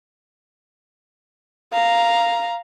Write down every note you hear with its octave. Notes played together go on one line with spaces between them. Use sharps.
F5 A#5